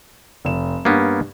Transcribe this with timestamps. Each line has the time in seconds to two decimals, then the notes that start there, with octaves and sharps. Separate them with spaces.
0.45 F1 E7
0.85 G2 A#3 B3 C#4